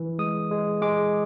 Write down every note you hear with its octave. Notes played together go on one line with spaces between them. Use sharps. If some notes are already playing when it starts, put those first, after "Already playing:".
Already playing: E3
G#3 D#6
G#3
G#3 D6